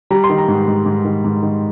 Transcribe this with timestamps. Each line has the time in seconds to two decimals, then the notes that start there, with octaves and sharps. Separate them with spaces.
0.11 G3 A#5
0.24 C6
0.30 D#3
0.38 A#5
0.48 G#2
0.68 G#2
0.86 G#2
1.05 D#3
1.24 G#2
1.42 D#3